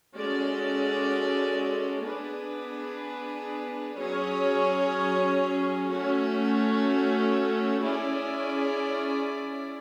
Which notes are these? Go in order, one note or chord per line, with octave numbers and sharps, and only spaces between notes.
G#3 C#4 F#4 A4 D5
B3 D4 G#4 B4
F#3 C#4 G#4 C#5
A3 C#4 F#4
C#4 E4 G#4 D5